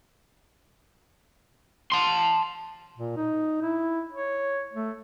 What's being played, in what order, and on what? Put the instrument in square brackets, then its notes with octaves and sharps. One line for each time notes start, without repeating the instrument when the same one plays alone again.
[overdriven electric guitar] A5 C6
[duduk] A#2
D#4
E4
C#5
A3